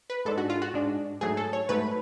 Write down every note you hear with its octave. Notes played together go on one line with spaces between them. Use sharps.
B4
G#2 G#3 D4 A4
F#4
F4
F#4
G#2 G#3 D4
G#2 F#3 A3 G#4
A4
C#5
G#2 F#3 A3 B4